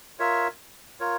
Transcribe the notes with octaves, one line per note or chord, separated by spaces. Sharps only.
F4 A#4 C#5 E5
F4 A#4 C#5